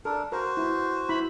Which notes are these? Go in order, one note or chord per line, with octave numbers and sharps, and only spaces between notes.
D4 A4 A#4
F#4 A#4 C5
E4
E4 B5